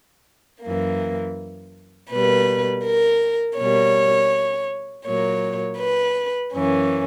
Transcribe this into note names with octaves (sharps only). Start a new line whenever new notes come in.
F#2 E3 A#3
B2 G3 A#3 B4
A#4
B2 G3 A#3 C#5
A#2 F#3 A#3 C#5
B4
F#2 E3 A#3 C#4